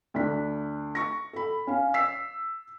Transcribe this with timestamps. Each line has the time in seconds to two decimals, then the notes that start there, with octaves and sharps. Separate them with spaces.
0.14 D2 D4 B6
0.95 C#6 A#6
1.33 A4 B5
1.67 C#4 F5
1.94 E6 B6 C7